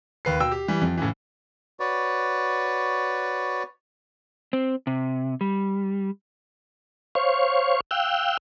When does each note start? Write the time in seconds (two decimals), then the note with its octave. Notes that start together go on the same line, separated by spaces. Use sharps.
0.25 D#2 B4 C7
0.40 B2 G5 E6
0.52 G4
0.68 E3 G3
0.81 F2
0.97 A2 C#3 E3
1.80 F#4 B4 C#5 D5
4.53 C4
4.87 C3
5.41 G3
7.15 C5 C#5 F5 C#6
7.91 F5 G5 E6 F#6